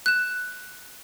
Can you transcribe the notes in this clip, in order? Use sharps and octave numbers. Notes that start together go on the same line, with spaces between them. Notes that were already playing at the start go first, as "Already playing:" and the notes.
F#6 E7